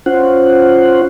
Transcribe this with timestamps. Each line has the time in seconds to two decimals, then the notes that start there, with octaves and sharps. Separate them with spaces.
0.06 C#4 F4 C5 F#5